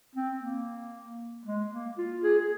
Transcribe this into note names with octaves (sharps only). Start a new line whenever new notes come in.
C4
A#3
G#3
A#3
F4
G#4
G#4